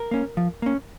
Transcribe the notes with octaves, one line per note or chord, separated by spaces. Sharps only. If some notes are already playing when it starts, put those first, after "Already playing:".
Already playing: A#4
A#3 C#4
F3
A#3 C#4